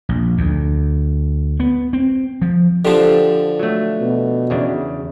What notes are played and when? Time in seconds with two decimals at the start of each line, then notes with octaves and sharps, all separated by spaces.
0.09 A#1
0.37 D2
1.60 B3
1.93 C4
2.42 F3
2.85 D3 F3 G4 C5 A5
3.59 F#3 A3
4.00 B2
4.50 E2 C#3 D4